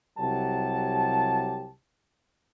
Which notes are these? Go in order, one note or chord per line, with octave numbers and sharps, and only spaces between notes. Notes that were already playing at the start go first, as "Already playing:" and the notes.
C2 F#3 G4 A5